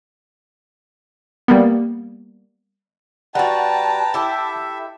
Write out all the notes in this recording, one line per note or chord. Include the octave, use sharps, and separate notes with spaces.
G3 A#3 B3
G3 F#4 B4 F#5 G5 A5 A#5
E4 G4 A4 E5